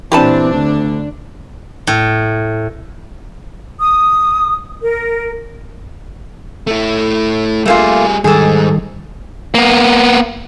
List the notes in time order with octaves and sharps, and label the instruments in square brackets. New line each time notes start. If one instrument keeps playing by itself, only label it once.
[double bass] A#2 C4 [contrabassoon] E3 [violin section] D4 [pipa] G4 B4 A5
[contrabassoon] D2 [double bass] D3
[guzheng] A2
[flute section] D#6
A#4
[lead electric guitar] A3 E4
[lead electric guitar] G3 G#4 [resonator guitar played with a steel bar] A3 A#3 F4
[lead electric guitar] G#2 [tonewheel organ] D#3 G3 [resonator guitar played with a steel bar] G#4 A4
[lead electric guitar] A#3 B3